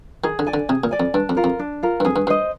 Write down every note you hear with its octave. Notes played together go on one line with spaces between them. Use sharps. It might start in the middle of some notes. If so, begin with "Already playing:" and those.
D#3 G#4
D3
D5 G#5
D3
C3 G#4
A#2
D5 G#5
F2
G2 D4
F2
F4 A#4
F2
D4
F4 A#4
G2
F2 G#4
G2
G2 C5 D#5